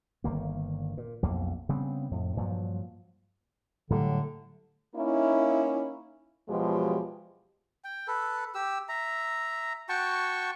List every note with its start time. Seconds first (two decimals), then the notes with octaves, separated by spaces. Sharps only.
0.24 G1 D#3 A#3
0.97 A#2
1.23 B1 F2 A#3
1.69 C#3 G3 B3 C4
2.11 F2 A2
2.37 G2 A#2 F3 F#3
3.90 A2 D3 F#3 G3
4.96 A#3 C#4 D#4 E4
6.49 E2 B2 F3 F#3 G#3 G4
7.84 G5
8.08 A4 B4
8.55 G4 E6
8.89 E5 A#5
9.89 F#4 G5 A5 C#6